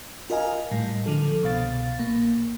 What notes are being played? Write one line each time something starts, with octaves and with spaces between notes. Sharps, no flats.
F4 A#4 D#5 F5 G#5 A#5
A2 G3
D3 F3 A4
C2 B2 F5 A6
A#1 A#3